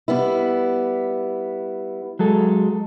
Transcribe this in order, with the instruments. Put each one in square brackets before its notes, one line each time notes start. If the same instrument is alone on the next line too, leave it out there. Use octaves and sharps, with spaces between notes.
[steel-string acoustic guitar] G3 B3 E4
[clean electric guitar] F#3 G#3 A4